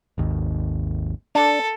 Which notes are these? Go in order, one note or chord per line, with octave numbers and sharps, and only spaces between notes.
G#1 D#2
D4 A4